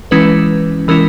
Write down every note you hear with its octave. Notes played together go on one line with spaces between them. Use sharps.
E3 G#3 C#4 E4 B4
E3 G#3 C#4 E4 A#4